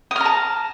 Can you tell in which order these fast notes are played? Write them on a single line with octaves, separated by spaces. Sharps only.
D#6 F6 A#5 A5